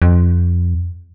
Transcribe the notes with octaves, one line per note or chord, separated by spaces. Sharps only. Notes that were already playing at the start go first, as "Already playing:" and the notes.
F2